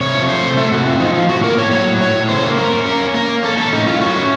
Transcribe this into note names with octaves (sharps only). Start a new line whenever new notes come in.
C3 C#5
F3
A3 C5
C3
A3 A4
C3 F#4
C4 F4
F3 D#4
A2 F4
A2 F#4
A#3 A#4
A2 C#5
F#3 C#5
A2
A2 C#5
A2
C#3 C5
A#3
C#4 A#4
C#4
A#3 A#4
C#4
A#3 A#4
A#3
C#4 A4
C#4 A4
A2 D#4
A2 F4
C#4 F#4
A3